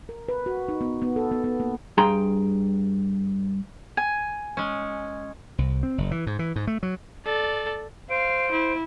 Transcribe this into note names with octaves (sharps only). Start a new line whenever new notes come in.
A#4
B4
F#4
D#4
B3
B3
A4
B3
B3
A#3
G2 G#4 G5 A#5 C6
G#5
G#3 C#4
C2
C4
F#1
E3
G#2
E3
G#2
A3
F#3
A4 D5
C5 F5 D7
E4